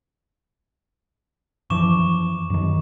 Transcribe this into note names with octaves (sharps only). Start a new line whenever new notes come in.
F#2 E3 F3 C#6 D6 E7
F#2 D#3